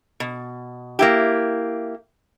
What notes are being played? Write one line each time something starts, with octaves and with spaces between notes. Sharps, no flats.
B2
A#3 E4 G4